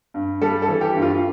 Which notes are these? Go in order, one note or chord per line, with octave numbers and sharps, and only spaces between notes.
G2
G3 A4
A4
E3
G4
G2
F4